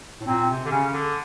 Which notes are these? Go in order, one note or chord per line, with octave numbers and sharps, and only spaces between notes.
A2
A#2 C4
C3
D3
C#3 C#4
D3